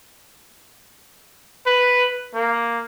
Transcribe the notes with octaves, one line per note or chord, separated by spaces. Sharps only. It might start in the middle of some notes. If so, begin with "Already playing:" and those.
B4
A#3